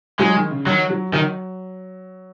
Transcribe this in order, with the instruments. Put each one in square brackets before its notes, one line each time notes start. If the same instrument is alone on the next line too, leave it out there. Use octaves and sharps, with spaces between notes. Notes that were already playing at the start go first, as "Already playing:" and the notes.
[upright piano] F#3 [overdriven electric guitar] G#3
[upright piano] D#3
C#3
[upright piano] D#3 [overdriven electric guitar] F#3
[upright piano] F#3
[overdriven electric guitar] D#3 [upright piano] F#3